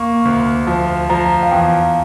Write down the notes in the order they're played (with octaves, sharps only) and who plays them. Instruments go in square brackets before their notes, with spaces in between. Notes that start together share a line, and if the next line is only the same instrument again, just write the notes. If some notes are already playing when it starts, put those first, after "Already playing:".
Already playing: [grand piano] A#3 [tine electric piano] C#6
[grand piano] D2
F3
[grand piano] F3 [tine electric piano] A#5
[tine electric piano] F5
[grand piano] E2 [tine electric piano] G5